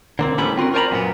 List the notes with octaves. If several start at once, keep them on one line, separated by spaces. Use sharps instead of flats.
D3 A#3 C4
A2 D3 G3 B3 C#4 B5
C4 F4 F#4 A#4
A#4 C5 D5 G#5 A#5 B5
F#2 A#2 B3